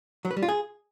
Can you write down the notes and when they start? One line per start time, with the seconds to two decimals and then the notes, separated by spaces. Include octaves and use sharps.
0.25 F#3
0.31 B4
0.37 G3
0.43 F4
0.49 G#4